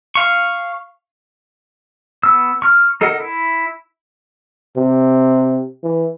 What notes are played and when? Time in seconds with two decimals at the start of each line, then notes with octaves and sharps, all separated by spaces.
0.15 F5 C#6
2.23 B3 E6
2.62 C#6 F6
3.01 D#4 A4 A#4 D#5 F#5
3.20 E4
4.77 C3
5.84 E3